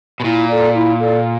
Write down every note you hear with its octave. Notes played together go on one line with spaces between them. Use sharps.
B2
A#2 E4
A4 D5
E4
A4 D5